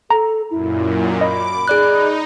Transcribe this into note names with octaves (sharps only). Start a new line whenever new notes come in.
A4 A#5
F#2 A#2 E4
D#5 B5 D6
D#4 G#4 D5 F#6